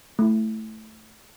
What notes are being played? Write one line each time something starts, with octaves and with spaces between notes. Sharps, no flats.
A3 E4